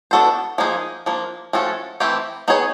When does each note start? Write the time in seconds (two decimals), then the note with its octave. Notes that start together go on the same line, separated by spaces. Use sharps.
0.11 B3 D4 F#4 A4 C5
0.58 F3 A#3 D#4 G#4
1.06 F3 A#3 D4
1.53 F3 A3 C#4 F#4 A4
2.00 E3 A3 C4 E4 G4
2.48 B3 D#4 G#4 C#5